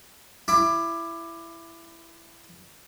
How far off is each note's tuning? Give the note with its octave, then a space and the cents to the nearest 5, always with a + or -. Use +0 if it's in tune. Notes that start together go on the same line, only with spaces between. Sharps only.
E4 +15 D6 +15